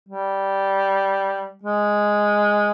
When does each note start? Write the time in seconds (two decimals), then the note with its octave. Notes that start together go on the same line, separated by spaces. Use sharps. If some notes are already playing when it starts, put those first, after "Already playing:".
0.09 G3
1.63 G#3